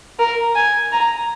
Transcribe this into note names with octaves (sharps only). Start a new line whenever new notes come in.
A#4
G#5
A#5